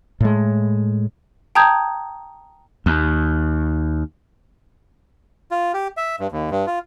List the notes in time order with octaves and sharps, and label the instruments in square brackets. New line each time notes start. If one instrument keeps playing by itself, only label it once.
[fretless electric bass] A2 G#3
[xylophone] G5 A5 A#5 D#6 G6 G#6
[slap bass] D#2
[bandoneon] F4
G4
E5
G2
D#2
G2
F4